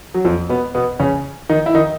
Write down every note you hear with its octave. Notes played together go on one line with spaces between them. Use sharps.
F#3
F2 F3
B2 B3
B2 B3
C#3 C#4
D#3 D#4
E4
D#3 D#4